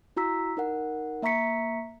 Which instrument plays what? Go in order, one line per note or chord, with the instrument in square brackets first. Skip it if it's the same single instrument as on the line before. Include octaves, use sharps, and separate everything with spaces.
[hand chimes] E4 F#4 A#5 E6 B6
D#4 A#4 F#5
A#3 E5 A#5 C#6 B6 C#7